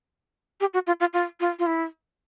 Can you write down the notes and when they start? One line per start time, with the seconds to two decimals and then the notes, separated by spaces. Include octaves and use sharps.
0.60 G4
0.74 F#4
0.87 F4
1.00 F4
1.13 F4
1.40 F4
1.59 F4
1.66 E4